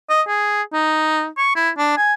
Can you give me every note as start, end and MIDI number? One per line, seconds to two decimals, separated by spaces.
0.09 0.21 75
0.27 0.62 68
0.73 1.26 63
1.37 1.54 85
1.55 1.70 64
1.78 1.96 62
1.97 2.14 80